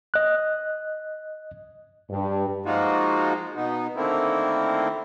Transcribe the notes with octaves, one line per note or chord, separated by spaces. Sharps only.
D#5 F#6
G2
F3 G#3 A#3 D#4 F4 F#4
B2 B3 D#4
D3 D#3 A3 A#3 C4 E4